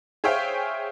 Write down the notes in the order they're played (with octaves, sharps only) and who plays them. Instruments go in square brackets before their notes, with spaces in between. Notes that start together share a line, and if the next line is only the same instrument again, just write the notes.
[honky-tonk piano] G#4 C5 C#5 E5 F5 G5